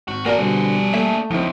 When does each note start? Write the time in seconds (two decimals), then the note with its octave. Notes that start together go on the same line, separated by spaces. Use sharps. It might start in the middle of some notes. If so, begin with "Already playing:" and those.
0.08 G#1 F#4
0.26 A#3 D4 F#4 G#4 A#4 D5
0.39 B2 D3 G3 C4
0.94 A3 A#3 D5 E5
1.31 C#2 F3 C4 D#4 E4